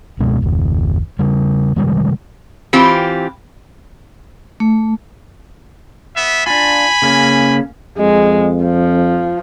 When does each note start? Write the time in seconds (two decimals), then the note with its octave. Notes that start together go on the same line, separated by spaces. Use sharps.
0.19 F#1 C#2 B2 G#3
0.42 F#1 D#2
1.19 C#3 G3
1.76 C3 D#3 G3 G#3
2.73 E3 C4 F4 G4
4.60 A3
6.17 B3 E5
6.47 D4 F4 G#5 B5
7.02 C#3 A#3 C#4
7.98 F2 G#3
8.64 F3